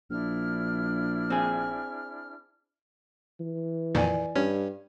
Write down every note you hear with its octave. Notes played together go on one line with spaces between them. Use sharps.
A#1 D4 E4 F6
C4 G#4
E3
F2 A#2 D#3 D5 G#5
G2 C#4